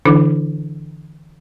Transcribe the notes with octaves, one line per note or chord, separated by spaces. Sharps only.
D3 E3 D4 E4 A4 D6